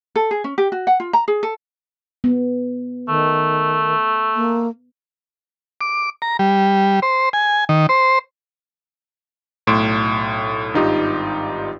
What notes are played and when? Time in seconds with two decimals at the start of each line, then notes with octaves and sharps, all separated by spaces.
0.16 A4
0.31 G#4
0.44 C#4
0.58 G4
0.72 F#4
0.87 F#5
1.00 F4
1.13 A#5
1.28 G#4
1.43 A4
2.24 B3
3.08 D#3 A3
4.35 A#3
5.81 D6
6.22 A#5
6.39 G3
7.02 C5
7.33 G#5
7.69 D#3
7.89 C5
9.67 B1 A2 C6 D7 E7
10.74 G#1 G2 D#4 F4 G4 D#6